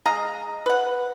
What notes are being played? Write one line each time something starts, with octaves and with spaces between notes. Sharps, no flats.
G#3 D#5 F5 A#5
B4 F#5